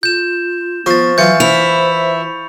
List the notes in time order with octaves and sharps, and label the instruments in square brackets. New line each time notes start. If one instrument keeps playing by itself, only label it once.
[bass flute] F4 [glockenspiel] G6 E7
[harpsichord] F3 C5 [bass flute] B3 [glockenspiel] C#6 A6
[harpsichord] E3 F4 [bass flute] F#3 [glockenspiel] G6 C#7
[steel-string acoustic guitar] E4 [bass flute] C5 [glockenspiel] F7